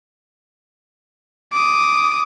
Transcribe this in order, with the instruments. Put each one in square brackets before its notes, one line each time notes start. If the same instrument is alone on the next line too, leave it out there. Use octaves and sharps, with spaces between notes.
[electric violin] D6 D#6